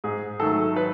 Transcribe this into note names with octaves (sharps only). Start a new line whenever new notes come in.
G#2 G#4
D#3 F#3 A3 A4
B4